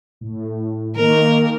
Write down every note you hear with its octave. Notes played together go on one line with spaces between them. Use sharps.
A2
D#3 A#3 A#4